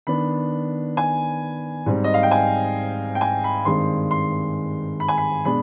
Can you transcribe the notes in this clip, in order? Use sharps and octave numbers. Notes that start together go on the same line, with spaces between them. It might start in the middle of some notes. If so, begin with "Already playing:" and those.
D#3 B3 D4 B5
G#5
G#2 G3 C4
D#5
F5
G5
G#5
G5
G#5
B5
G2 D#3 G#3 C4 C6
C6
B5
G#5
B5
B2 G#3 D4 B5